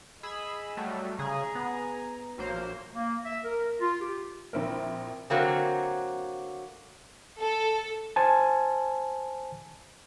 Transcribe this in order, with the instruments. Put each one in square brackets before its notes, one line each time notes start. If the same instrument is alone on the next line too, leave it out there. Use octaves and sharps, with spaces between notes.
[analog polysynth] G#4 B5 E6 [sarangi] D#5
[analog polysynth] F#3 G3 A3
[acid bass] C#3 [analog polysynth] G#4 [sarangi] A#5
[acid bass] B3
[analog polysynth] A#1 A#3 C5 [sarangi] F#3
[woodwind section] A#3
E5
A#4
F4
G4
[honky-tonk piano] A#1 C4 E4 A#4
[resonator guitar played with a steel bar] D3 F#3 A#3 C4
[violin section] A4
[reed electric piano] C5 G#5 A5